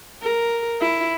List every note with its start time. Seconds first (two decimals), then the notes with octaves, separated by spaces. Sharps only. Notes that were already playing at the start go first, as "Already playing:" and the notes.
0.22 A#4
0.81 E4